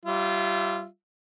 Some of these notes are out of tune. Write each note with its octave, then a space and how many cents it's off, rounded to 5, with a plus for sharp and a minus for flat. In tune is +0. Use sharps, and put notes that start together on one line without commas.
G3 -25 F4 -20 E5 +0